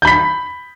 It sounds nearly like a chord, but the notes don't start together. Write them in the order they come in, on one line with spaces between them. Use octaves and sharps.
G6 B5 B6